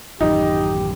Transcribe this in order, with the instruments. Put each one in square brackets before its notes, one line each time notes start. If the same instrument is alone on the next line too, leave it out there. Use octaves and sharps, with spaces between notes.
[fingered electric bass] A1 F#2 D#3 [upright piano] D#4 [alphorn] G4